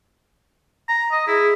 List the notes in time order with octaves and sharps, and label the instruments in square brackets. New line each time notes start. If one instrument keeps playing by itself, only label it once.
[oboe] A#5
D#5
[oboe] E4 [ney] G#4